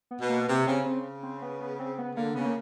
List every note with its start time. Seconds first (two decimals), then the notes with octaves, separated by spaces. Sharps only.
0.11 B3
0.21 B2
0.29 A#3
0.48 C3
0.67 C#3 C4
0.86 C#3 C4
1.23 C4
1.42 B3
1.60 B3
1.79 C4
1.98 B3
2.16 D3 A#3
2.35 C#3 B3
2.45 A#3